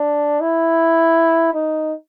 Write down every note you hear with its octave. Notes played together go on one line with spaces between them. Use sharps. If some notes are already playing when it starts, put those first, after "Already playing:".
Already playing: D4
E4
D#4